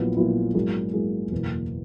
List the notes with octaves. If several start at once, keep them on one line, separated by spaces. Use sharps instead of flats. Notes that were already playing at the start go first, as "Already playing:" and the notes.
Already playing: A#1 A#2 F#3 B3 E4
A#1 A#2 F#3 B3 E4
G#2 F#3 A#3 E4 G#4
G#2 F#3 A#3 E4 G#4
F#1 E2 B2 A#3